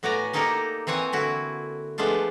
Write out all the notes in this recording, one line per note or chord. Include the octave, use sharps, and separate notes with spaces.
A2 B3 F#4 D5 G#5 A#5
A#3 D#4 G4 A4 A#4 D5
E3 C4 C#5 F#5 G#5
D3 E4 F#4
F3 G#3 A3 B3 D4 F4